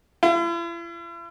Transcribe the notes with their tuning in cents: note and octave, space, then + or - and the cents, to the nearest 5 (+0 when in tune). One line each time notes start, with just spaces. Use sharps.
E4 +45